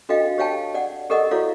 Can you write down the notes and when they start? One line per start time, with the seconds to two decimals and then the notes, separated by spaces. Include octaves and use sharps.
0.09 D4 F#4 A4 D#5 F5 G5
0.38 G4 C#5 F5 G5 A5
0.74 D5 F#5
1.10 G4 A4 A#4 D5 D#5 F#5
1.31 E4 F#4 A4 C#5 D5 F5